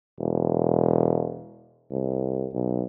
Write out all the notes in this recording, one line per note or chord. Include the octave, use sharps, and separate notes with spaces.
E1
C2
B1